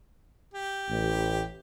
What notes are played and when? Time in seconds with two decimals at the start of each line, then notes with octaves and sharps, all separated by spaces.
0.54 G4
0.89 A1